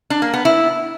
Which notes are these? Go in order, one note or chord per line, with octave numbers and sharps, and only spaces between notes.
D4
A#3
B3
E4